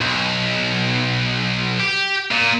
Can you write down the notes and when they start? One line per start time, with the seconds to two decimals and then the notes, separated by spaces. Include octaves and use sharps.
0.01 B1
1.80 G4
2.32 A#2